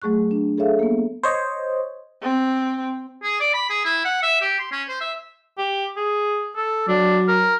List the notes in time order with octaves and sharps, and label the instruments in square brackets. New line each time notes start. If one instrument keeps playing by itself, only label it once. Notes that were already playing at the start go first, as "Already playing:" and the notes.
[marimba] F#3 A3 G#4 C#6 F#6
D4
G#4 A4 C#5 E5 F5
A#3 B3
[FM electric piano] C5 C#5 D#5
[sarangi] C4
[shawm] G#4
D5
B5
G#4
E4
F#5
E5
G4
C6
C#4
C5
E5
[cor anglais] G4
G#4
A4
[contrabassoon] F#3 [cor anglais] D4
[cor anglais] A#4